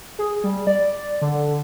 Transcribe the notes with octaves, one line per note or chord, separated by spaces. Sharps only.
G#4
G3
D5
D3